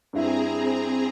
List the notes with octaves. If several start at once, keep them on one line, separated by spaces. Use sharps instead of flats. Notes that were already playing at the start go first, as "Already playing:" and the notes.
G2 C4 E4 G#4 A#5